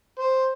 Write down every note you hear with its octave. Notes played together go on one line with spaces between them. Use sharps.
C5